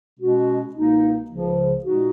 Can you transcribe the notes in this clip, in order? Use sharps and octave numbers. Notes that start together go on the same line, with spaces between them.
B2 G#3 C#4 F#4
C#2 B2 A#3 D#4
C#2 C#3 F3
A#2 G#3 D#4 F#4